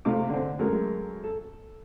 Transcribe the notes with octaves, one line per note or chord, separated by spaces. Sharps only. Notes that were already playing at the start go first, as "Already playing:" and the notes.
C3 A3 D#4 F5 D6
D3 C4
F#2 G#3 A3 A#4
A4